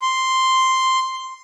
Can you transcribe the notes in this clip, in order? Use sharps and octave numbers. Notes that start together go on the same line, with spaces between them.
C6